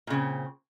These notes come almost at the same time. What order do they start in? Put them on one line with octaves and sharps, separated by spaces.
A#2 C#3 C4